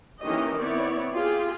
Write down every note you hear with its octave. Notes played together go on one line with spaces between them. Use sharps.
D#3 E3 A#3 C#4 G4 D#5
B3 C4 E4 C#5 D5
F4 G4 G#4